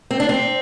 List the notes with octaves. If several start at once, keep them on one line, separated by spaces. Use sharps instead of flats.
C4
D4
C4